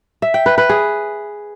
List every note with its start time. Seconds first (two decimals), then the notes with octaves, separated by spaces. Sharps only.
0.22 E5
0.34 G5
0.46 B4
0.58 B4
0.69 G#4